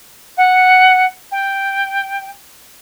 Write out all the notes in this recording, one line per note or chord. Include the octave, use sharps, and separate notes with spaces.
F#5
G5